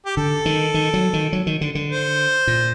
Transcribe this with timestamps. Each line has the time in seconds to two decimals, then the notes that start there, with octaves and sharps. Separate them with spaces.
0.05 G4
0.17 D3 A4
0.46 D#3
0.74 D#3
0.94 F#3
1.13 D#3
1.33 F#3
1.47 D#3
1.61 D3
1.75 D3
1.90 C5
2.47 A#2